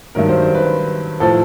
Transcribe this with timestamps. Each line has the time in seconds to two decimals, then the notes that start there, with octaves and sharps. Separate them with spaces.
0.15 G2 D#3 F#3 A#4
0.29 C5
0.42 C5
0.55 B4
1.20 A2 F3 A4